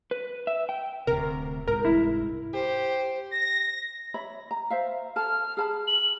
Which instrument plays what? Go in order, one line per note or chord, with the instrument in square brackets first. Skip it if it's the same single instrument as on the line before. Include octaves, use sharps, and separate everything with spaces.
[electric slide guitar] B4
E5
G5
[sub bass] D1 [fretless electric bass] D2 C3 [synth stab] A#4
[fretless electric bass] C2 G#2 [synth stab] A#4
[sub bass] F1 [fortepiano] E4
[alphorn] G4 [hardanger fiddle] C5
[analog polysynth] A#6
[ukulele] C#5 E5 B5
A#5
C5 E5 F5
[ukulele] A4 A5 [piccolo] F6
[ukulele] G#4 A5 B5
[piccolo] F#7